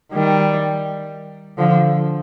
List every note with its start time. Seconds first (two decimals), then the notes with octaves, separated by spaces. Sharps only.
0.12 D#3 G3
1.58 D3 F3